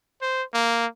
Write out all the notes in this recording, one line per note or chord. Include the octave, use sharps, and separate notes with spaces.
C5
A#3